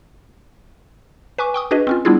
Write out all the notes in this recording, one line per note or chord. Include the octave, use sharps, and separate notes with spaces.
B4 G#5 C#6 D6
G5 C#6 D#6
D4 F#4 G#4 B4 D#5
C4 C#4 F4
G3 B3 D4 E4 F4 G#4